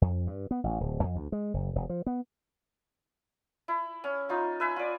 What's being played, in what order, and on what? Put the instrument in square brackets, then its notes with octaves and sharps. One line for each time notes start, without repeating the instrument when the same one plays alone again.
[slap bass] F2
G2
B3
A1
D1
F2
D2
G#3
F#1
E1
F3
B3
[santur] E4
C#4
D#4 F4 C#6
B4 E5 G#5
F4 D5